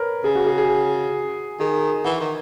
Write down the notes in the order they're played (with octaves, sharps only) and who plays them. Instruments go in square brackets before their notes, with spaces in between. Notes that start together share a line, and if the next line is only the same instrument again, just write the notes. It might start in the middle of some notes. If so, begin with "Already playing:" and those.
Already playing: [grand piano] A#4 B4 C#5
[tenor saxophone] C#3 [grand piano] G#4
[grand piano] F#4
G#4
G#4
[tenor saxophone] D#3 [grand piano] G#4
[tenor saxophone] E3 [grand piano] F#5
[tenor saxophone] D#3